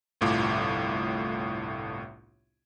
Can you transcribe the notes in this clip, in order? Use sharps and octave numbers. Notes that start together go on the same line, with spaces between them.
G1 C2 A2 F4 D6